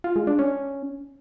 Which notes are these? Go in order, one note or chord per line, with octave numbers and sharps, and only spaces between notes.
F4
G#3
D4
C#4